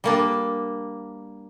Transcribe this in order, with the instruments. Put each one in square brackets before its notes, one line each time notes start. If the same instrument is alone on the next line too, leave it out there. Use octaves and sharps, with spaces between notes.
[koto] G3 A#3 D4